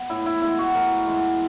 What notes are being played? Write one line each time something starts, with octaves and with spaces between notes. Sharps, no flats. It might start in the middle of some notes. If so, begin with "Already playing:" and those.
Already playing: B3
A2 E4
E4
E3 G#3 B3 E4
F#4
A2 A#4
E3 G#3 B3